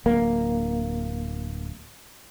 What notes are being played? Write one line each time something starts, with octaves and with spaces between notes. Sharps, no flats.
D1 A#3